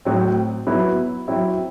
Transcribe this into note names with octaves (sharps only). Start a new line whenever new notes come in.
A2 F#3 C4
F#3 B3 E4
F#3 C4 E4